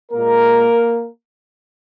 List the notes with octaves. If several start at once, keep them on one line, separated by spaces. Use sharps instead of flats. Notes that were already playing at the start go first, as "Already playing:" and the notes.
A#2 G#3 A#3 A#4